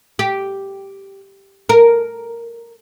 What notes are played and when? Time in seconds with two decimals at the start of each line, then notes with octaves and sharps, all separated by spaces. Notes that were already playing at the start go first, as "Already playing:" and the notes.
0.19 G4
1.69 A#4